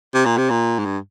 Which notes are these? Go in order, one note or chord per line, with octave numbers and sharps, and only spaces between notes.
C3
A#2
C3
A#2
G#2
G2